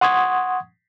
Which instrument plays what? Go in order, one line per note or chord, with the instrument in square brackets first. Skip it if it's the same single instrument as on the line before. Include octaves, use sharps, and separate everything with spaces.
[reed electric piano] F#5 C6 C#6 D#6 G#6